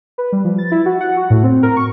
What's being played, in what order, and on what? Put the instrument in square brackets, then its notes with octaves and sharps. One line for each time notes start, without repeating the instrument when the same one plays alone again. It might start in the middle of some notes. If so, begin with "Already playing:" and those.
[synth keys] B4
G3
F3
A6
E4
F#4
F#5
F#4
A2
C4
A#4
C#6